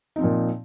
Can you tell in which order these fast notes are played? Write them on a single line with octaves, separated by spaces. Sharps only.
D#4 C4 F3 A#2